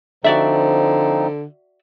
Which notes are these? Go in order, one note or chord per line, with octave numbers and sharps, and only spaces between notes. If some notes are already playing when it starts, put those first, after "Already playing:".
D3 F3 C4 D#4 F#4 D5 E5